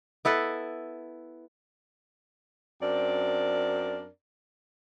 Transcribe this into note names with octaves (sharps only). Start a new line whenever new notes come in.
B3 E4 A4 B4
F#2 C4 D4 A#4 D5